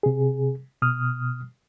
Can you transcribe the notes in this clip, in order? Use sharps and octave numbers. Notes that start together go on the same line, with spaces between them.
C3 G#4
B2 D#6 F6